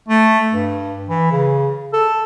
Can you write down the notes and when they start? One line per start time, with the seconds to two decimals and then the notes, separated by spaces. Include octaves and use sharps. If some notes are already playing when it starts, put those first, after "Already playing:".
0.09 A3
0.52 G2
1.09 E3
1.32 C#3
1.93 A4